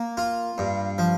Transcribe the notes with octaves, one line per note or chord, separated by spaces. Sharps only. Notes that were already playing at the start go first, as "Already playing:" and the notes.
Already playing: A#3
F4
G2
F3